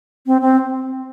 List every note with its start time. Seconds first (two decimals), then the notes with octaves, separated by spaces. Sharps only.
0.27 C4
0.41 C4